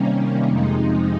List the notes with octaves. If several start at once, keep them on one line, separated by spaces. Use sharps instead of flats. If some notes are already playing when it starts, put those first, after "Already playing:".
Already playing: C3 D#3 G3 A#3 C#4
F2 C3 F3 G#3 D#4